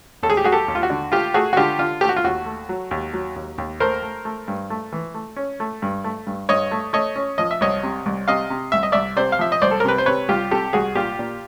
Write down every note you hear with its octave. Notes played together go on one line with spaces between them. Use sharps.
D#2 A4
G#4
G4
F#3 F#4 G#4
G4 A4
D#2
F4
F#4
D3
A3 F4 G4
A3 F#4 G#4
F#4
D3 F4 G4
D3 F4
A3 G4
F#4
F4
D#2 F#4
A3
F#3
D#2
F#3
D#2
D#2
A3 A#4 C5
A3
A3
G2
A3
E3
A3
C#4
A3
G2
A3
G2
G2 C#5 D#5
A3
A3 C#5 D#5
C#4
F3 D#5
E5
C2 C#5 D#5
C3
C2
C3 D#5 F5
C3
C2 E5
D#5
C2 D5 E5
C3 C5 D5
F5
F3 E5
D#5
C2 C5 D5
A4
A#4
C3 B4
C5
C3 B4 C#5
C2 F4 G4
C3 G4 A4
C2 F#4 G#4
A#2 F4 G4
A#2